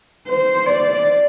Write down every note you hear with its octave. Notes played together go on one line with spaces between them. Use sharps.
C5
D5